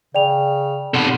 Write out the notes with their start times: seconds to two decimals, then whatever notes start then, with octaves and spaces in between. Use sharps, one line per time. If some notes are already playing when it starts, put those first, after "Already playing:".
0.15 C#3 D5 G5 F7
0.94 C3 B3 A4